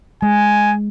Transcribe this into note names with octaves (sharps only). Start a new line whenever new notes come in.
G#3 G#5